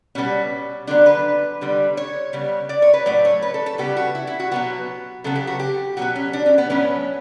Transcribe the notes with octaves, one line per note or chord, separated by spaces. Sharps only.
B2 G3 B3 C#4
D3 F#3 B3 D4
B4
D3 G3 B3
C#5
C#3 G3 B3
D5
C#5
B4
A2 F#3 A3 D5
C#5
B4
A4
A4
C#3 G3 B3 G4
F#4
E4
E4
F#4
B2 F#3 B3 F#4
C#3 F#3 B3 A4
G4
F#4
G4
B2 F#3 B3 F#4
C#4
D4
C#4
B3
A2 F#3 B3 C#4